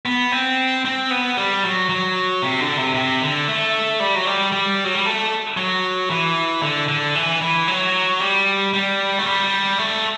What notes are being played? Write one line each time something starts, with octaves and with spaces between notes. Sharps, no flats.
B3
C4
C4
B3
G3
F#3
F#3
C3
D3
C3
C3
D3
A3
G3
F#3
G3
G3
F#3
G3
A3
F#3
E3
D3
D3
E3
E3
F#3
G3
G3
A3
G3
A3